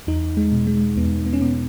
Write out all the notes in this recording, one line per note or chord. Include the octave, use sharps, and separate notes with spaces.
E2 D#4
G#3
B2
G#3
E2 B3
B3
C#4
B2 B3